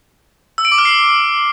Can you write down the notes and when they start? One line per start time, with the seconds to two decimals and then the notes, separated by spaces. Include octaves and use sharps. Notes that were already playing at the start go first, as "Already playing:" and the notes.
0.58 E6
0.65 D7
0.72 D6
0.78 F6
0.85 C7